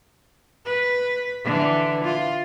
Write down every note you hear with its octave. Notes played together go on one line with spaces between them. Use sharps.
B4
D3 E3
F4